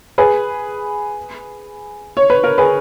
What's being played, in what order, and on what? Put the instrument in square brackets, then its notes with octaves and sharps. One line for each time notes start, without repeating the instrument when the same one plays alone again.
[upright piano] G#4 B4
C#5
B4
A#4
G#4 B4